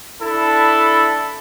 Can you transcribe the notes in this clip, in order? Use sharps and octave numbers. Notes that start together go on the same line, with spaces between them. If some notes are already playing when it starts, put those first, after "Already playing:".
D4 E4 A4 B5